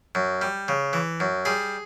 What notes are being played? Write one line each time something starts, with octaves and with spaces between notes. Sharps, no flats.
F#2
G3
C#3
E3
F#2
G3 G#4